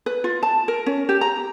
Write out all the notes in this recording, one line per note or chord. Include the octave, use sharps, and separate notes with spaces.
B4
F4
A5
A#4
C#4
G4
A#5